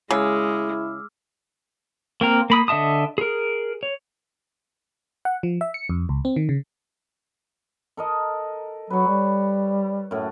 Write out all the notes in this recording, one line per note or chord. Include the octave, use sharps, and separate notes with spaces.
C#3 G#3 E4 D6 E6 F6
A#3 C4 A#4
A#3 B5 D#6
D3 D#5 E5 A5 D#6
G#4 A#4
C#5
F#5
F3
E5
C#7
F2
C#2
C4
D#3
C#3
A4 A#4 D#5
F#3 B4 C#5
G3
F#2 A2